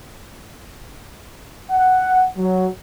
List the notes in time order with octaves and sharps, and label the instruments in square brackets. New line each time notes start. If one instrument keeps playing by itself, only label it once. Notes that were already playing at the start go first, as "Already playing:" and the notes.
[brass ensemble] F#5
F#3